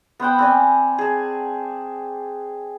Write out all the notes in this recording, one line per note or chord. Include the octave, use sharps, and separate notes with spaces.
B3 C5 F#5 G5
C4 D5 G#5
G#4 A5